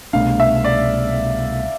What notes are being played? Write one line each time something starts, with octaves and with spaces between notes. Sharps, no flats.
C2 B2 A3 D4 F5
E5
D5